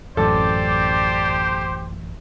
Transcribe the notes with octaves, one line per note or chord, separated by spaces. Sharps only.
A1 F#2 G4 A4 C5 D5